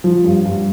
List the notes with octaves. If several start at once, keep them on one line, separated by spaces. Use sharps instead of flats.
F3
G2
G2